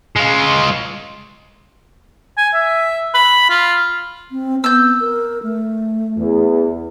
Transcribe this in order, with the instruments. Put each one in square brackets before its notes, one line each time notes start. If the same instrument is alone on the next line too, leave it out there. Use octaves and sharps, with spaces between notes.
[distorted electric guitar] G#3 F4
[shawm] G#5
E5
B5
F4
[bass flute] C4
[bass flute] B3 [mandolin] E6 G6
[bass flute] A#4
A3
[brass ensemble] E2